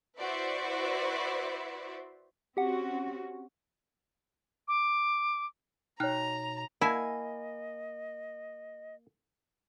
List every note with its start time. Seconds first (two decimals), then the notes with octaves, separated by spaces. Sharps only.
0.18 E4 F#4 B4 C5 D5 E5
2.57 C4 C#4 F#4 G4 F#5
4.68 D6
6.00 B2 D#4 C#5 G5 A#5 F6 F#6
6.81 A#3 E4 D#5 G#5